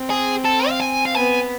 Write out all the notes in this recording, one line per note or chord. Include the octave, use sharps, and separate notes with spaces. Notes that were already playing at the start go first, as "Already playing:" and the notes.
Already playing: C4
G#4
A4
F5
G#5
F5
B3 G#5